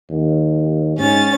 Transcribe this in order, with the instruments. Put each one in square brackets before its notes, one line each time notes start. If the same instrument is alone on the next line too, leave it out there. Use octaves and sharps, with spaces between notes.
[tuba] D#2
[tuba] G#2 [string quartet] C#4 A6